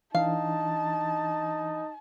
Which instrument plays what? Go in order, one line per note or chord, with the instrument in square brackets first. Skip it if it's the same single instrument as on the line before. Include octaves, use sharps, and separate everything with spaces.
[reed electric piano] E3 D4 [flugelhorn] D#4 [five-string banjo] F5 [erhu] A5